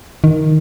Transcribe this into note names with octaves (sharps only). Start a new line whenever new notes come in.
D#3